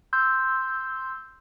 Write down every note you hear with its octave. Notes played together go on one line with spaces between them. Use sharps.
C6 E6 G6